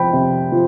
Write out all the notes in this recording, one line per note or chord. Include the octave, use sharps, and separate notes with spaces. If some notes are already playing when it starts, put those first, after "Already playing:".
Already playing: C3 F3 C4 G5 B5
C3
F3